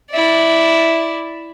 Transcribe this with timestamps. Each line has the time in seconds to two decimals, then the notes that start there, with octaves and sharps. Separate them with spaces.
0.11 E4 D5